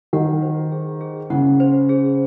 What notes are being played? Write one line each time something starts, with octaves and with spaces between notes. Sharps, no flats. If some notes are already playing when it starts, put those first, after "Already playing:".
D#3 F#5
C5
G#4
G#4
C#3 F#5
C5
G#4